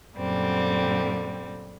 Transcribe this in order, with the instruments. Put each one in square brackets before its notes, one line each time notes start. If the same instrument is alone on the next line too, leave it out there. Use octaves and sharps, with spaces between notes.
[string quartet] F#2 A#2 D3 G3 C4